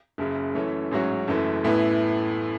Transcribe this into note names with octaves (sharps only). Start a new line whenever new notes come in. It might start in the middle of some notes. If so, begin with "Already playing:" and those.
F#1 F#2 C#3
F#2 E3 A3 C#4
A1 G#2 F#3 C#4 F#4
F#1 F#2 E3 A3
A1 A2 E3 B3 E4